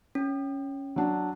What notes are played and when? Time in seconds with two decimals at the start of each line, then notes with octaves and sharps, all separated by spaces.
0.15 C#4
0.96 F#3 D4